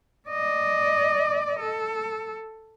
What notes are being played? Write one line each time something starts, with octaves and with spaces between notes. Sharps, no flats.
D5 D#5
A4